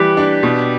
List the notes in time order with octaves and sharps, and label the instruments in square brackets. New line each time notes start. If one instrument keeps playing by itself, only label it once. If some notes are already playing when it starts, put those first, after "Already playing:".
Already playing: [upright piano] E3 G3 [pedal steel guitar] G4 B4
[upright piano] D4
B2